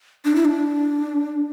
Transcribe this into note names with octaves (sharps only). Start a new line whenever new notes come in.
D4
E4
D4